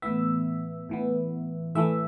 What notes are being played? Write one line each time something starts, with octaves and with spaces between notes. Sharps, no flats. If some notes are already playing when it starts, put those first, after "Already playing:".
A2 E3 B3 E5
A2 E3 B3
A2 E3 A3 E5